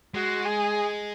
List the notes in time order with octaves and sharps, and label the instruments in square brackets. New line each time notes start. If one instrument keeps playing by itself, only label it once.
[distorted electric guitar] G#3 [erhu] F#4
[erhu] G#4